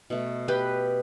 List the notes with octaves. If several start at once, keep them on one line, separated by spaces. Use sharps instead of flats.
B2 A3
G4 B4